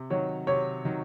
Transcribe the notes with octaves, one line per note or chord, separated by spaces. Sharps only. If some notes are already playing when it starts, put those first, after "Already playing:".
Already playing: C3
D#3 F#3 C#5
C3 C#5
D#3 F#3